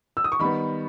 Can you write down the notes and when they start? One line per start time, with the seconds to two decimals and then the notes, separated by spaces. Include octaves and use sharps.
0.17 E6
0.24 D#6
0.32 C#6
0.39 D#3 G3 B3 B5